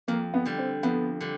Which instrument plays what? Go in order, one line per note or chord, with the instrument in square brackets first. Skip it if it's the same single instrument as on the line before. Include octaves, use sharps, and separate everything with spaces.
[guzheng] F2 [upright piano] A#3
[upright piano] B3
[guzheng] D3 G3
[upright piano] C4
[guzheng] F2 [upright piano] B3
[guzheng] D3 G3